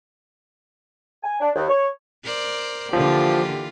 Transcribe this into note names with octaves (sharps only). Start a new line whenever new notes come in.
G#5
D4
D#2
C#5
A#4 C5 D5
D3 E3 F3 A#3 F4 G4